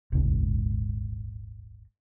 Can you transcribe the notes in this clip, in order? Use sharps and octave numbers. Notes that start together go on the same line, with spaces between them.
D#1 G#1 C#2 G#2